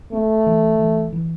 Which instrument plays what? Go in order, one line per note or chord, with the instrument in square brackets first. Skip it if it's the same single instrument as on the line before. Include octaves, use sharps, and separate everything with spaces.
[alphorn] A3 [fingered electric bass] C4
[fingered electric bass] E3
E3
E3